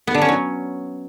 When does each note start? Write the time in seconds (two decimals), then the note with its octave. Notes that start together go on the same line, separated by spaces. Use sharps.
0.07 B3
0.14 D3
0.22 C#4
0.29 F#3